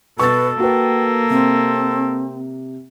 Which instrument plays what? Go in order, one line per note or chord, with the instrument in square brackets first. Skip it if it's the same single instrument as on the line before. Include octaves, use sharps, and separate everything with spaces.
[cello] B2 [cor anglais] A4 [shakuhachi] B4 [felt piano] C#6 A6
[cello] A#3 [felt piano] F#4 B4 [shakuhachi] G5
[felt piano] C3 [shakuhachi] C4